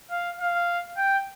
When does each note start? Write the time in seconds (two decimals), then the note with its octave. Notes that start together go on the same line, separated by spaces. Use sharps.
0.11 F5
0.40 F5
0.97 G5